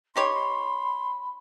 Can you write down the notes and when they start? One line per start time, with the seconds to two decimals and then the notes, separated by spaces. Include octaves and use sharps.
0.16 D#4 G4 C#5 B5 C6
0.33 C6